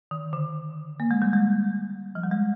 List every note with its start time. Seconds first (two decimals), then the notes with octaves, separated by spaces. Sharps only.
0.11 D#3
0.33 D3
1.00 A#3
1.11 G#3
1.22 G3
1.33 G#3
2.15 F3
2.24 G3
2.31 G#3